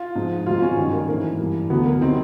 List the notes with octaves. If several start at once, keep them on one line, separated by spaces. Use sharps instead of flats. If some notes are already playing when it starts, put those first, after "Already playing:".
Already playing: F4
G#2 F3
G#2 D#3 F#3 F4
C#4
G2 D#3 F#3 C#4
A#3
G#2 E3 A#3
G2 E3
D2 D3 F#3 B3
A#3
C3 D#3 F#3 C4